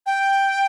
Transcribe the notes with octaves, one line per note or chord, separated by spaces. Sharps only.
G5